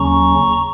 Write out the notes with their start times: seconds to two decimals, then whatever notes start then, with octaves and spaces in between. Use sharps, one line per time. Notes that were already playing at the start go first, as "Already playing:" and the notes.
Already playing: D#2 C#3 F#3 C#4 A#5 C#6